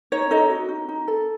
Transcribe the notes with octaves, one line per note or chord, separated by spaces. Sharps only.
D#4 C#5
D#4 A4 D#5
F#4
D#4
D#4
A4